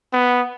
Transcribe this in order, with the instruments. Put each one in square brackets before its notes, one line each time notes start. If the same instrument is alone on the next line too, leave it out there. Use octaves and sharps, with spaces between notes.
[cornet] B3